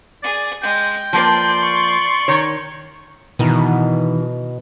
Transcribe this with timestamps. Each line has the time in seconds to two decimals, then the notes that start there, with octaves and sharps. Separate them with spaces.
0.23 G#4 D5
0.63 G#3 G5
1.13 F3 A#3 B4 D5 C6
1.63 C#6
2.28 D#3 C#5
3.39 B2 D#3 E3